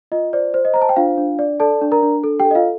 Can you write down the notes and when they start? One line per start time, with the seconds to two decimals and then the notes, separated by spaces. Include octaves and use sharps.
0.12 F4 D#5
0.33 C5 D5
0.54 C5
0.65 D#5
0.74 C5 A#5
0.82 A5
0.89 G5
0.96 D4 F4 F5
1.18 D4
1.39 D5
1.60 A4 D5 A5
1.82 D4
1.92 A#4 A#5
2.02 D4
2.24 A4
2.40 G4 G5
2.45 A4
2.51 D#5
2.55 F4 F5